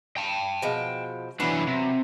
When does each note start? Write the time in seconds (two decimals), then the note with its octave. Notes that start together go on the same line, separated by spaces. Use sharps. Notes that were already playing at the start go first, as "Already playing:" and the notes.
0.17 G5 A5
0.62 B2 F3 G#3
1.40 E3 F#3 B3 C#4 D4
1.67 C3